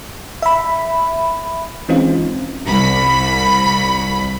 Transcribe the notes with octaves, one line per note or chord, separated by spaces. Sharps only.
E5 B5
E3 G#3 C4 C#4 D#4 F4
C2 B5